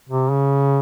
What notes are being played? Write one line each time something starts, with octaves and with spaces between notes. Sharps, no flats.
C3
C#3